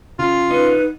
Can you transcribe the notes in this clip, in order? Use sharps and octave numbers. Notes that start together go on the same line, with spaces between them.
C#3 F4
D#4 B4